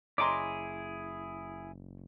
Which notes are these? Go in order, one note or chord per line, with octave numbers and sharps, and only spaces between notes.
F#1 E4 G#4 C#5 D#5 A#5 C6 D6